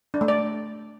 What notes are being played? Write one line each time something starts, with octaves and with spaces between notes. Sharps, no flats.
D4
A3
D5